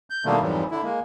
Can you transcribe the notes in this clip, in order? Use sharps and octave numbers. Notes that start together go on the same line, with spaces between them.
G6
B2 D3 D#3 G3 A3 A#3
F2 G#2 E3 F#3 G3
D3 E4
G#3 A#3